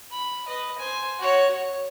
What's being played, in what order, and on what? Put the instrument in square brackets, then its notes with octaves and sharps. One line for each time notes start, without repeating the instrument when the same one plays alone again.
[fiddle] B5
B4 D#5
C5 G#5
F#4 C#5
C#5